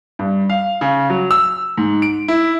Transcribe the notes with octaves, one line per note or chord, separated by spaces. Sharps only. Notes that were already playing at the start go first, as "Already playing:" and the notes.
G2
F5
C#3
F#3
E6
G#2
D7
E4